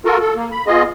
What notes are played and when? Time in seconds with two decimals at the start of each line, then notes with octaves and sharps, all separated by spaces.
0.05 F4 F#4 A4 A#4
0.21 A4
0.35 A#3
0.52 B5
0.67 B3 F4 G#4 D#5